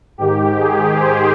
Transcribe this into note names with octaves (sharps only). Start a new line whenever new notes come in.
G#2 D#3 G4
G#4
C5